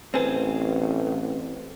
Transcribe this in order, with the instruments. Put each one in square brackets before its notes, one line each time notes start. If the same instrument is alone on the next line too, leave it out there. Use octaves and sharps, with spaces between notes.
[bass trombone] A1 [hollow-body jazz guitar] C4 G#4 [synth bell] B4 C5